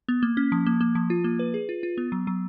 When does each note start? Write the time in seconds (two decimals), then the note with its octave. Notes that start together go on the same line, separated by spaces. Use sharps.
0.08 B3
0.23 A#3
0.37 C#4
0.52 F3
0.66 A#3
0.81 A#3
0.95 F3
1.10 F4
1.24 A#3
1.39 B4
1.54 G#4
1.69 F4
1.83 F4
1.97 B3
2.12 F#3
2.27 F#3